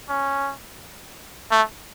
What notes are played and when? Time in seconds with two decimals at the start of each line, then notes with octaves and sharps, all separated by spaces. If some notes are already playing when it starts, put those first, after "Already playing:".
0.09 C#4
1.51 A3